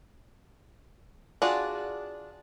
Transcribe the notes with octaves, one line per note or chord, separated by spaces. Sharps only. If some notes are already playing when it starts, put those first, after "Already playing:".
D4 F4 F#4 G#4 D5